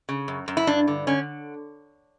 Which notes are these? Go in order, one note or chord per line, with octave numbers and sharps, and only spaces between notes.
C#3
F#2
F#2
E4
G2 D4
D3
D3 C#4